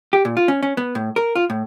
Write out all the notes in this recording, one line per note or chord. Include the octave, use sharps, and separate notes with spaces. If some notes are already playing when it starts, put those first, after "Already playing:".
G4
A#2
F4
C#4
C#4
B3
A2
A#4
F4
A2